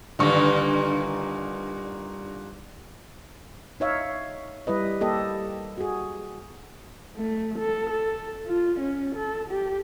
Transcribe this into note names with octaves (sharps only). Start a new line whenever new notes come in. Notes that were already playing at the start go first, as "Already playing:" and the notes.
G2 A#2 D3 D#3 C#6
D#4 C#5 E5 F5
G3 E4 B4 D#5
A#3 G4 A4 D#5
F#4 G#4
A3
A4
A4
F4
C#4
A4
G4